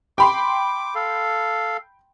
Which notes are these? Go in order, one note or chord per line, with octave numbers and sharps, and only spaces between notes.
G5 B5 C6 D6
A4 F5